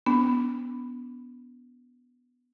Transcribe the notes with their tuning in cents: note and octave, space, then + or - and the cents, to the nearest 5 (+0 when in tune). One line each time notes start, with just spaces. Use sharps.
B3 +0 D4 -40